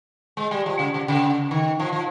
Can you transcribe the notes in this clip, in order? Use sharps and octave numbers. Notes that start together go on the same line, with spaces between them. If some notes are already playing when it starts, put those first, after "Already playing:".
G#3
G3
F3
C#3
C#3
C#3
D#3
F3
F3